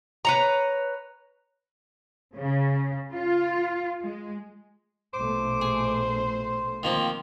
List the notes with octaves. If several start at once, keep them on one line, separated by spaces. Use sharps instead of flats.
B4 C#5 A#5
C#3
F4
G#3
A#1 B2 A3 C5 D6
G#4
C6
D#3 F3 A#3 C4